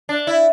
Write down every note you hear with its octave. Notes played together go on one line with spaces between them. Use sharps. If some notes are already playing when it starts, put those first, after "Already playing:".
D4
E4